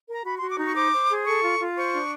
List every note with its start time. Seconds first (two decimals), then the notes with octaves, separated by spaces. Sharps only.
0.08 A#4 A#5
0.25 F#4 B5
0.38 C6
0.42 F#4
0.50 D6
0.59 D#4 C#6
0.76 C5 D6
0.93 C5
1.09 G#4
1.26 A4 C#6
1.43 F4
1.60 F4
1.76 C5 C#6
1.93 D4